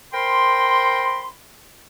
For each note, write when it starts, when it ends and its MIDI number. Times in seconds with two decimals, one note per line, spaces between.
0.13 1.28 70
0.13 1.28 72
0.13 1.28 79
0.13 1.28 83
0.13 1.28 84